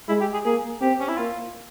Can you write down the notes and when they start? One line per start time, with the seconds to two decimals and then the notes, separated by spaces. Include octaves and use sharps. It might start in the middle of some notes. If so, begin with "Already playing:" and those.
0.08 G#3 E4
0.21 G4
0.33 G#4
0.45 A#3 G#4
0.81 C4 G4
1.00 C#4
1.08 E4
1.17 A#3 F4